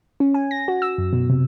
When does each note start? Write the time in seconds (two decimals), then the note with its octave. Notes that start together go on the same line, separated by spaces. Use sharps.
0.20 C#4
0.34 G#5
0.51 A#6
0.68 F#4
0.82 E6
0.98 F#2
1.13 B2
1.29 C3